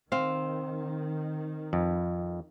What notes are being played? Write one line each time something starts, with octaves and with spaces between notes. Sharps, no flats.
D#3 C4 F5
F2